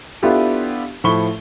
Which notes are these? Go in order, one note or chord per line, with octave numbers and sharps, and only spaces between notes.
B3 D4 E4 F4 G4 A4
A2 F3 B5 C#6 G7